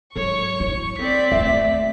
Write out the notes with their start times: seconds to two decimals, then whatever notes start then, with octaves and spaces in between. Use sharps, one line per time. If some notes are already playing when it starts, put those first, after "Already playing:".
0.16 G#2 F#3 C#5 C#6
0.60 D#4 E4
0.99 C4 D5 B6
1.32 D#2 A3 E5